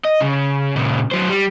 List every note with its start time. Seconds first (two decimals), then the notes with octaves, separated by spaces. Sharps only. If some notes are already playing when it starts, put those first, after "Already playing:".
0.05 D#5
0.20 C#3
0.76 A#2 C#3
1.11 F#3 C5
1.30 G3